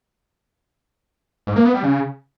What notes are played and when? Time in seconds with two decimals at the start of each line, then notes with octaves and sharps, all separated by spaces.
1.47 G#2
1.56 A#3
1.65 B3
1.74 G3
1.83 C#3